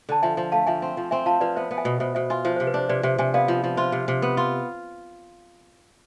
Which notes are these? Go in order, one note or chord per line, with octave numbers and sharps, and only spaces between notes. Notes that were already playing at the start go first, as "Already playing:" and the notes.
D3 A5
F3 E5 G#5
F3
A3 F5 A5
F3 E5 G#5
C4
F3
C4 E5 G#5
F3 F5 A5
F3 B4 D5
B3 C5 E5
B3
E5 G#5
B2
B2 C5 E5
B2 C5 E5
F4 E5 G#5
F3 C5 E5
C3 C5
B4
D4 C5
C3 B4 D5
C3 C5 E5
C3 E5 G#5
B3 D5 F5
F3
F3
F4 C5 E5
C3
C3
B3
F4